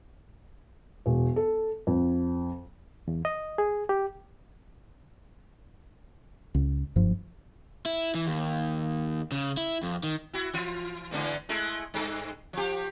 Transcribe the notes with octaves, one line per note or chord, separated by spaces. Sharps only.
E1
A4
F2
E2
D#5
G#4
G4
C#2
F#1 G2 F3
E4
E3
D#2
C#3
E4
F2
D#3
E4 F#4
E3 F4
E2 G#2 D3
G#3 A3 E4
G2 A4
F3 G4